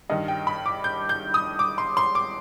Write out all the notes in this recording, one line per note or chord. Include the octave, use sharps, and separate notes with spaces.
G2 D#3 D#5
G5
B5
D6
G6
G6
D#6
D6
C6
C6
D6